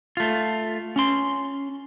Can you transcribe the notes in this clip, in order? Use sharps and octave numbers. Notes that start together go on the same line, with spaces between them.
A3 F4
C#4 C6